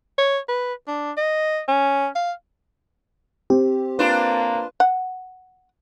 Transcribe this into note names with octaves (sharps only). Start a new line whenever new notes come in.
C#5
B4
D4
D#5
C#4
F5
C4 G4
A#3 D4 F4 B4 C5
F#5